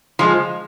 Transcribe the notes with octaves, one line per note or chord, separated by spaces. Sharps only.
F3 G#3